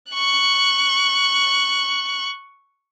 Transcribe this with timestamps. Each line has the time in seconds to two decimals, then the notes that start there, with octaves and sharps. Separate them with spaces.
0.12 C#6 F#6